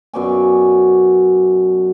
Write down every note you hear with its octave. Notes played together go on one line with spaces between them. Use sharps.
F#2 B2 D5 G#5